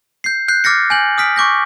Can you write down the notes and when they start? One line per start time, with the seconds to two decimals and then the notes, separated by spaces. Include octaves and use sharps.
0.24 G6 C7
0.48 F#6 G6 C7
0.64 D6 F6 A6 A#6 C#7
0.90 G#5 G6 F#7
1.18 D#6 F6 B6 D7
1.36 C#6 D6 G6 A#6